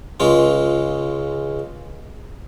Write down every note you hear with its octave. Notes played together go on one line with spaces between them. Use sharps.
C#2 G#3 F4